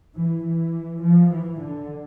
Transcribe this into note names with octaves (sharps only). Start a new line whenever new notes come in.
E3
E3
F3
E3
D3